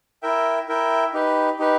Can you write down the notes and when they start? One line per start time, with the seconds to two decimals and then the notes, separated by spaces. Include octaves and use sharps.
0.23 E4 A#4 E5 G5
0.68 E4 A#4 E5 G5
1.13 D#4 G4 B4
1.59 D#4 G4 B4